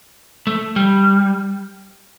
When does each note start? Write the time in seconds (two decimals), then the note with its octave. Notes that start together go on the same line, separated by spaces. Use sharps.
0.47 A3
0.76 G3